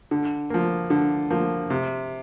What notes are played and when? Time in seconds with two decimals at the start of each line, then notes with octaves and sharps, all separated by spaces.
0.11 D3
0.50 F3 A#3
0.90 D3
1.31 F3 A#3
1.70 C3